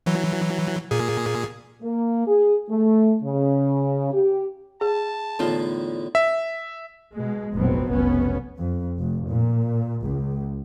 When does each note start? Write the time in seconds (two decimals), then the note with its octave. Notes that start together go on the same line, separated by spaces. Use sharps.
0.06 E3 F#3
0.91 A#2 G#4
1.83 A#3
2.26 G#4
2.69 A3
3.22 C#3
4.13 G4
4.81 G#4 A5
5.39 E2 A2 D3 D#4 F4
6.15 E5
7.15 B2 G#3
7.53 F1 A#1 B2 F#3 B3 C4
7.90 F1 B1 B3 C#4
8.56 F2
8.98 F1
9.30 A#2
10.01 C#2